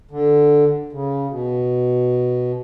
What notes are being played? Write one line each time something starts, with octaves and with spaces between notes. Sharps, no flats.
D3
C#3
B2